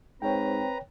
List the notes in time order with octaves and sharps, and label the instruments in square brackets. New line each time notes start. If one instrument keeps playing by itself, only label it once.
[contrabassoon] G#2 [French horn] C4 [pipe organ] B4 A#5 [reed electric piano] C#5 G5